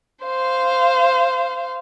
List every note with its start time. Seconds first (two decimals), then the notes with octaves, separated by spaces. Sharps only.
0.24 C5 F5